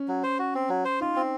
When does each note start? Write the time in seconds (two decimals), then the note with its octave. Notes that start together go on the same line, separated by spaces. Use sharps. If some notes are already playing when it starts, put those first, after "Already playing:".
Already playing: C#4
0.08 F#3
0.23 C5
0.39 F#4
0.55 C4
0.69 F#3
0.85 C5
1.01 D#4 F4
1.16 C4